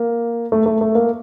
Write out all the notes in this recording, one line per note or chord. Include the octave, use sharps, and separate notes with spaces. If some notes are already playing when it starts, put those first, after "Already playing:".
Already playing: A#3
A3
A3
A3
A#3